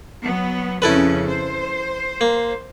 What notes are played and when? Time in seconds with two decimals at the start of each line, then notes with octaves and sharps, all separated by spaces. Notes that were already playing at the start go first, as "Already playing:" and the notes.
0.23 F#3 B3
0.82 F2 C#3 C#4 E4 A4 B4
1.27 C5
2.21 A#3